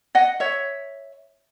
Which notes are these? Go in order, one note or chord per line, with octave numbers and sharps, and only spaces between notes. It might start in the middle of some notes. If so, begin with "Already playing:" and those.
D#5 F#5
C#5 E5